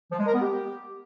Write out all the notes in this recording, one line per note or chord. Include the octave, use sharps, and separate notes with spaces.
F3
G#3
A#4
B3
G4